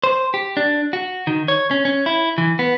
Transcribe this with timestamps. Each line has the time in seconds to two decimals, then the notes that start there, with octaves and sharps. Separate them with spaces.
0.04 C5
0.34 G4
0.57 D4
0.93 F#4
1.27 D#3
1.48 C#5
1.71 C#4
1.85 C#4
2.06 E4
2.38 E3
2.59 B3